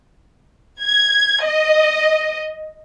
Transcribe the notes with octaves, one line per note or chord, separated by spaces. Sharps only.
G#6
D#5